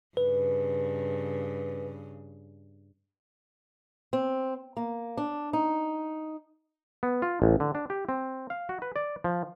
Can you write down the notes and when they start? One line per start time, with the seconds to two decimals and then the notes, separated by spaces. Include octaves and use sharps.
0.17 G2 C#3 B4
4.13 C4
4.77 A#3
5.17 D4
5.53 D#4
7.03 B3
7.22 F4
7.42 A1
7.60 D3
7.75 D4
7.90 G4
8.09 C4
8.50 F5
8.69 F#4
8.82 B4
8.96 D5
9.24 F3